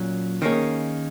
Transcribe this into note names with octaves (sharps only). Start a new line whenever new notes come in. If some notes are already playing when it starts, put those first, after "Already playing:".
Already playing: A#2 F#3 C#4
D#3 A#3 C#4 G#4